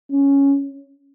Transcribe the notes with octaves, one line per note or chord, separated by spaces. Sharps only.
C#4